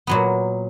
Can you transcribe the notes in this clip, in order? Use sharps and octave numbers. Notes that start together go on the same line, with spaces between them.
A#2 F#3 B3